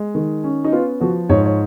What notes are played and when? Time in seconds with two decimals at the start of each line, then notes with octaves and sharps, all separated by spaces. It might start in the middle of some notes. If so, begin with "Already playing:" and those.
Already playing: G#3
0.15 D#3
0.44 C#4
0.64 D#4
0.72 B3 F4
1.00 F3 F#4
1.29 G#2 C#5
1.46 C#5